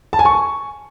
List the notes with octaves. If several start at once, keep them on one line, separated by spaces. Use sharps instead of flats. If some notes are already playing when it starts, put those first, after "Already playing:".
A5
G#5
C#6